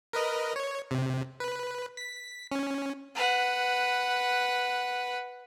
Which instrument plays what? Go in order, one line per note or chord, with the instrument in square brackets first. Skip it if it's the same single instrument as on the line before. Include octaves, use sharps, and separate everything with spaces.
[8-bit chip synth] A#4 B4 D#5
C#5
C3
B4
B6
C#4
[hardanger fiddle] B4 F#5